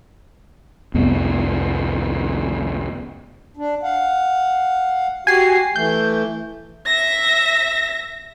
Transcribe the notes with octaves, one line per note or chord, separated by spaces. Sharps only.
C2 F2 B3
D4
F5 F#5
F#4 G4 F#5 G#5 C7
E3 A3 G6
E5 A#6